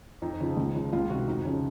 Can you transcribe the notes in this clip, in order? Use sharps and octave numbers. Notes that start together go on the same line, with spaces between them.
F2 D#4
C#3 F3
C#2
C#3 F3
C#2 F4
C3 D#3 F#4
F2 D#4
C#3 F3 C#4